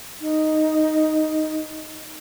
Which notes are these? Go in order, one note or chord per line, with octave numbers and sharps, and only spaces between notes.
D#4